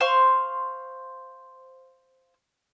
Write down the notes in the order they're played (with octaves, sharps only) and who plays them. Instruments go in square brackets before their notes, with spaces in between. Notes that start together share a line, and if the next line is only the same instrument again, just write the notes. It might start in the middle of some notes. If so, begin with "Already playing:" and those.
[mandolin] C5 F5 C6 C#6